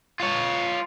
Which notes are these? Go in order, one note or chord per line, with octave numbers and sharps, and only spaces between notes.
F4 C#5